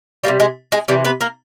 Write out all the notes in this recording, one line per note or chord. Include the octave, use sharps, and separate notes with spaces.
C3 E3 G3 A#3 A#4
G#3 G#4
G#3 G#4
C3 E3 G3 G4
B3 B4
A#3 A#4